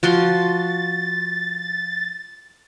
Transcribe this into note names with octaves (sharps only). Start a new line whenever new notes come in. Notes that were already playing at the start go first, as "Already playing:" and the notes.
F3 F#4 C6 A6